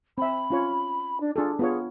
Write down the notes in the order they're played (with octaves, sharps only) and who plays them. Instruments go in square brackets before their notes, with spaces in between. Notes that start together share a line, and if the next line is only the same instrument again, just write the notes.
[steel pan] C4 E5 [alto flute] B5
[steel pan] C#4 F4 C#5
[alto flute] D4
[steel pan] D4 G#4 A4 [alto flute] F4
[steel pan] B3 F4 C#5 [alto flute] G#4